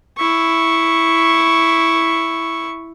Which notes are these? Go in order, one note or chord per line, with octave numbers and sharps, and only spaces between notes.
E4 C#6